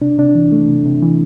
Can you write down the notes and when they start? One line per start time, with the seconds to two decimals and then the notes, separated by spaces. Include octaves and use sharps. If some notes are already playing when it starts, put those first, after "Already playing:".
0.01 C3 D4
0.18 C3 D4
0.35 E3
0.52 A3
0.68 C3
0.86 C3
1.02 E3